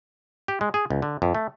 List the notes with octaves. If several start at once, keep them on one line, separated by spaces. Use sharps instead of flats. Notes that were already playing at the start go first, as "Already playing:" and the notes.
G4
G#3
G#4
C#2
D3
F2
A3